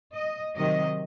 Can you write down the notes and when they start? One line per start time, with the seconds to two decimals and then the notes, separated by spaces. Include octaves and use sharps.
0.15 D#5
0.54 C3 D#3 F#3 D#5